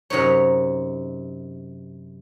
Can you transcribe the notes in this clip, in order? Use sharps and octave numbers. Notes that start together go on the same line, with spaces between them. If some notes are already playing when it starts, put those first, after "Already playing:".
F#2 C3 D#4 C#5